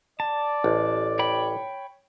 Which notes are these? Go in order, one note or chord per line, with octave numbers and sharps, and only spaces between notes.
D5 A5
A1
C#5 G5 B5